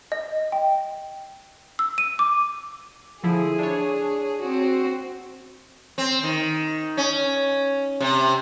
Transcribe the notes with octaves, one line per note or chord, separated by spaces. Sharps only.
D#5
G5
E6
D#7
D6
D3 F3 E4 G#4
D4 C#5
C4 F#4
C4
D#3
C#4
C3